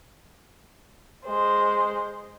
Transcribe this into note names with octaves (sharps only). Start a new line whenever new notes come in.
G#3 C5